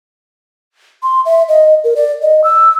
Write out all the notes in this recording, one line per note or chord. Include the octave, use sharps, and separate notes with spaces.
C6
E5
D#5
A#4
D5
D#5
E6